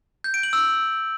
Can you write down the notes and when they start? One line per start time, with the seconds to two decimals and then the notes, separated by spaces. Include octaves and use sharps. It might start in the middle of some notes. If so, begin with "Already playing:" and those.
0.24 G6
0.34 D7
0.43 F#7
0.53 E6